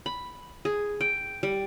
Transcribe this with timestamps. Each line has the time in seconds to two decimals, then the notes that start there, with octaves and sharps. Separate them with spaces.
0.06 B5
0.65 G#4
1.01 G5
1.43 G3